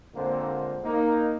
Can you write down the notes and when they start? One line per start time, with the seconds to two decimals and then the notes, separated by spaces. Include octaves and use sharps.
0.15 A#2 D3 G#3 A#3 C4 C5
0.84 A#3 D#4